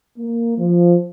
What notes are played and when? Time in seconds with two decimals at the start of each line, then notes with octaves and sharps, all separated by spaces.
0.17 A#3
0.57 F3